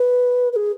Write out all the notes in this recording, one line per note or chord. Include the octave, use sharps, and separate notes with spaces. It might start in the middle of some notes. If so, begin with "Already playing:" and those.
Already playing: B4
B4
G#4